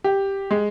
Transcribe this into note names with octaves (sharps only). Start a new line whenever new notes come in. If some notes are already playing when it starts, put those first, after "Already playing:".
G4
G#3